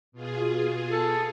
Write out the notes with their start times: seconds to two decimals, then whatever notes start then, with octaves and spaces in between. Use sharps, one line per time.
0.12 B2 F4 G#4
0.90 A4